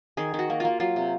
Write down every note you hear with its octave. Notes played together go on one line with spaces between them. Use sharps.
D#3 G#4
D#3 F#4
A#3
A#3 F4
F#3 F4
C3